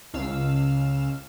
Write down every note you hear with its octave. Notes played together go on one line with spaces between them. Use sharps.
C#2 F5 E6